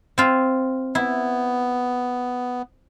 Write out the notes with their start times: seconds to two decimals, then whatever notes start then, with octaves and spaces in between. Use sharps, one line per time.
0.18 C4 F4
0.95 B3 E4